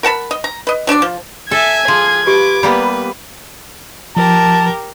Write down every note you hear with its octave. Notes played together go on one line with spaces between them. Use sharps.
A#4 F#5 A5 B5
D#5
A#5
B4 D#5
F#3 D4 B4 D5
F3
A4 E5 G#5 G#6
F3 G#4
G4 B4 D6
G3 A#3 B3 B4
F3 G4 A#4 A5